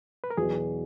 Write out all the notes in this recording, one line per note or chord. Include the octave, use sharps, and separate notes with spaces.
B4
A#4
E2 B2 F#3 G#4